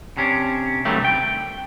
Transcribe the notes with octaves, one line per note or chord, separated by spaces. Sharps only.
C3 C#4 D4
G2 C3 D#3 F#3 G3 A3
G5